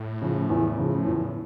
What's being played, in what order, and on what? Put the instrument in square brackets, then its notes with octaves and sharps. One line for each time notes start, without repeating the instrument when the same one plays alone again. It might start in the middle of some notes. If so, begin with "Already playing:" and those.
Already playing: [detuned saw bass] A2
[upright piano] C#3 F3
E2
C#3 F3
E2